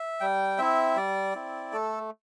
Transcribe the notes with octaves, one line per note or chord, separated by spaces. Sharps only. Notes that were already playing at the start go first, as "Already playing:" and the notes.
Already playing: E5
G3 G5
C4 E4 E5
G3 D5
C4 E4
A3 A4